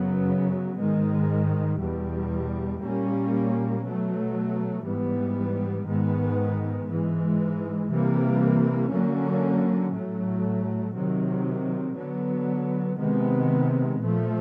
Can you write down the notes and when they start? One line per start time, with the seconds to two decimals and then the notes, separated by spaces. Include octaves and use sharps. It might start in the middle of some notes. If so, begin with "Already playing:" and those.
Already playing: F#2 C#3 F#3 B3
0.77 G#2 D#3 G#3
1.79 E2 B2 G3
2.81 A#2 G3 A#3 C#4
3.82 B2 F#3 A3
4.85 G#2 E3 G3 B3
5.86 G#2 D#3 G#3 B3
6.88 G#2 E3 G#3
7.90 C3 E3 G3 A#3
8.91 D3 F#3 A#3 C#4
9.93 A2 F#3 A3
10.95 C3 D#3 F#3
11.97 D3 F#3 B3
12.98 C3 D#3 G#3 B3
14.00 A#2 F3 A3